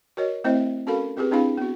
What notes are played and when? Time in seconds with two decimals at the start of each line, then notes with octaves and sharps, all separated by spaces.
0.17 F#4 A#4 C#5 D#5
0.44 A3 C4 E4 C5 D#5 E5
0.87 C#4 F#4 A4 A#4 F5 B5
1.17 C4 F4 G4 G#4 B4
1.31 C4 D4 E4 G#4 F5 B5
1.57 B3 F#4